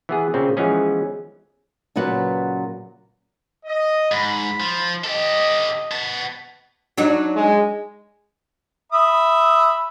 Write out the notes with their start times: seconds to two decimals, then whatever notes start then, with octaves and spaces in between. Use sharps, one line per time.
0.09 E3 B3 G#4
0.34 A#2 C#3 C4
0.57 E3 F3 G#3 B3 C#4 G#4
1.96 A#2 C#3 F#3 B4 F#5
3.65 D#5
4.12 G#2 B5
4.60 F3
5.04 G4 A4 D#5
5.91 B3 A5
6.97 F#3 D4 D#4
7.36 G#3
8.92 E5 B5 D#6